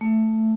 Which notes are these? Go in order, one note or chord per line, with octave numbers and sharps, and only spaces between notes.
A3